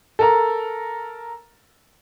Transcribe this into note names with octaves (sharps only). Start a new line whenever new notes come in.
A4 A#4 A#5